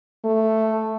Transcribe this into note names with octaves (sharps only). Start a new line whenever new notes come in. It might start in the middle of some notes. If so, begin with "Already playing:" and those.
A3